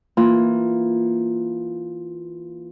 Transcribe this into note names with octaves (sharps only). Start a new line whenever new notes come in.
E3 A#3 F4